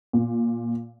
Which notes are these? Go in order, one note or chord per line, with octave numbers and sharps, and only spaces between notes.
A#2